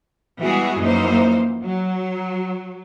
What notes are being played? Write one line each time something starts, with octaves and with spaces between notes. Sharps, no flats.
E3 G3 G#3 B3 F#4 G#4
F#2 E3 F3 A#3 D#4 C5
F#3